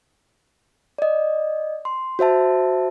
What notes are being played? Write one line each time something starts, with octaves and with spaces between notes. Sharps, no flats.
D5 D#5
C6
F#4 C5 E5 A5